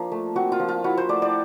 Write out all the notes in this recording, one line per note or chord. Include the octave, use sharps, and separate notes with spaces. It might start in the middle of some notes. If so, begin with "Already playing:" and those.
Already playing: F3 A#3 D4 F4
A3
C4 F#4
F4
F3
F4
E4 F#4
C5
A3 D5
D5